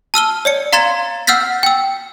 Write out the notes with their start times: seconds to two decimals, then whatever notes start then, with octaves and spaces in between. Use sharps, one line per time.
0.14 A5 E6 F6 G7
0.45 C#5 D5 C#7
0.73 F5 A#5 C6 G#6 A6 E7
1.27 F#5 E6 F6 G6 A6 B6
1.63 G5 E6